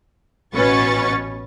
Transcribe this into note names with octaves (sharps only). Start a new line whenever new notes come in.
A1 B2 C#4 B4 C#6 A6